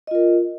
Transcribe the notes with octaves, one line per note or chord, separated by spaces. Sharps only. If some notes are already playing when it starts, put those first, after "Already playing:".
F4 A#4 D#5